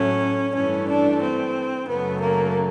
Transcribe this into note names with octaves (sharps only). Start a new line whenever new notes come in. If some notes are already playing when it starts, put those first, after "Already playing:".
Already playing: A2 F#3 A3 C#4
G2 E3 A3 C#4
D4
C4
F#2 C#3 F#3 A3 B3
A#3